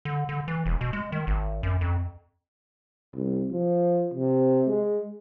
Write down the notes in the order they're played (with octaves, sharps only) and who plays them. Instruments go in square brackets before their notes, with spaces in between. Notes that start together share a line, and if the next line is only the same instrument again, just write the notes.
[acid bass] D3
D3
E3
E1
B2
G#3
D#3
G#1
F#2
F2
[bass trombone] C2
F3
C3
G#3